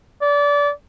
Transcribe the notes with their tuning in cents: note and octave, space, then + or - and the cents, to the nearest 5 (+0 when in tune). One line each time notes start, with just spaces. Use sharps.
D5 -25